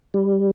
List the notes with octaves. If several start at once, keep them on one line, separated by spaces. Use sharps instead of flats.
G3